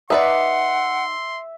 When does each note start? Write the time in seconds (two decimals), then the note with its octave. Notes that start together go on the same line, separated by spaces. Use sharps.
0.10 D#4 B4 D5 E5 F#5 C6